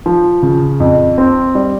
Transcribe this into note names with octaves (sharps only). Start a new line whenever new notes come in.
F3
C#3
F2
C4
G3